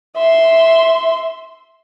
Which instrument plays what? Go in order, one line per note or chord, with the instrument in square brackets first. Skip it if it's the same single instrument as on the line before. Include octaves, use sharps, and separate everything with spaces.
[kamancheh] E5 C6